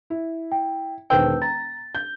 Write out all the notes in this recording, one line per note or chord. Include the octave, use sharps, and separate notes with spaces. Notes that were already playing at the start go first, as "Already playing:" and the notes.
E4
G5
E1 D#3 B4 C5 G5 E6 G6
A#5 A6
G6